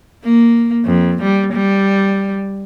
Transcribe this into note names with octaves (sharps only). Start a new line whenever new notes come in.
A#3
F2
G3
G3